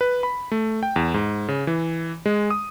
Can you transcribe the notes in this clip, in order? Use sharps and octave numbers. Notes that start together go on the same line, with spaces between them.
B4
B5
A3
G5
E2
G#2
C#3
E3
G#3
D#6